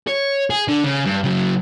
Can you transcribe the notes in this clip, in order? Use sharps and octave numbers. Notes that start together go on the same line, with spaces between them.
C#5
G#4
D3
C#3
G2
C#3 F#3